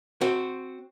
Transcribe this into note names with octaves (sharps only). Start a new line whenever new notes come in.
C4 F#4